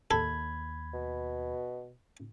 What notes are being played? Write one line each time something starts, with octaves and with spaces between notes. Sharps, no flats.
D#2 A4 B5 G#6
B2